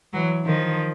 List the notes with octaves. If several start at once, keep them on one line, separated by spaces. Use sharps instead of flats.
E3 F#3
D#3 F3